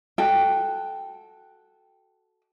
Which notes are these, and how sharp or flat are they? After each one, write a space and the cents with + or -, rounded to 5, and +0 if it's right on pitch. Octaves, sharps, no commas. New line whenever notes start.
F#4 +0 A4 -10 G5 +0